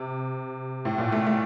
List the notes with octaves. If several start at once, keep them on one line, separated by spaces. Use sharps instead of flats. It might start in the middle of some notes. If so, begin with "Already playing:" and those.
Already playing: C3
A2
A#2
A3
A3